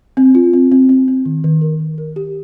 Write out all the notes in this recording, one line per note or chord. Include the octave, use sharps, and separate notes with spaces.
C4
F4
C4
C4
C4
C4
D#3
D#3
A#4
D#3
A#4
G4